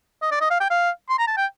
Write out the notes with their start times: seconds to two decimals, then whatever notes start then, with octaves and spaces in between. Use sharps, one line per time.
0.22 D#5
0.31 D5
0.41 D#5
0.50 F5
0.60 G5
0.70 F5
1.09 C6
1.18 A#5
1.27 A5
1.37 G5